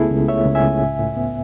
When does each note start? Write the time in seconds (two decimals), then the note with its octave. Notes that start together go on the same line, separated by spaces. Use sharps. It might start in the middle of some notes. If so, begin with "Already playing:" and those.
Already playing: C#2 A3 B3 E4 G#4 A4
0.11 C#2
0.28 A3 C#5 E5
0.45 C#2
0.55 E5 G#5
0.63 C#2
0.81 A2
0.99 A2
1.17 B3